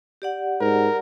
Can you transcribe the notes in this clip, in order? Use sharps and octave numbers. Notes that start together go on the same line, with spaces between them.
G4 D5 F#5
G#2 A#4